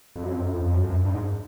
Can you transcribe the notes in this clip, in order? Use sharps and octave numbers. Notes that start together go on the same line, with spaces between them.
F2
F#2
F2
F#2
F2
F2
F#2
F#2
G2
G#2